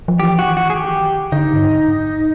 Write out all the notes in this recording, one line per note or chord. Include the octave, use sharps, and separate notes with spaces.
F3
E3 G4
F#4
D#3
F#4
G#4
G4
D3 D#4
G2
G#2